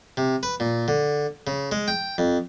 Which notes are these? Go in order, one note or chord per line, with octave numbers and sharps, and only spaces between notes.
C3
B4
A#2
D3
C#3
G#3
G5
F2